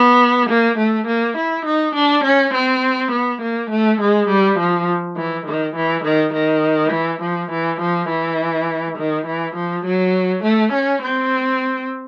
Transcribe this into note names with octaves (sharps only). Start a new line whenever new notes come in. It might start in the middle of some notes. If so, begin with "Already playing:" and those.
Already playing: B3
A#3
A3
A#3
E4
D#4
D4
C#4
C4
B3
A#3
A3
G#3
G3
F3
E3
D#3
E3
D#3
D#3
E3
F3
E3
F3
E3
D#3
E3
F3
F#3
A3
C#4
C4